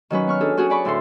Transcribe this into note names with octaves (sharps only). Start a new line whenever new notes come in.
D#3 F#3 C#4 B4
B3 C#6 F6
D4 G#4 A4
C#4 F#4 G#4
G#4 B4 D5 B5 C#6
D2 A2 E4 A4 C6